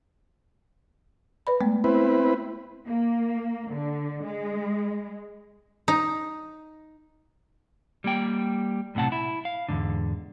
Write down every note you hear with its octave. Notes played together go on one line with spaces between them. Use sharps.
B4 D5 B5
G#3 A3 B3
C4 E4 B4
A#3
D3
G#3
D#4
G3 A#3 G5
B1 A2 C3 F#5 A5
E4
F5
E2 G#2 D3